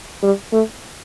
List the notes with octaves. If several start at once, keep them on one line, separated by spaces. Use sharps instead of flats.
G3
A3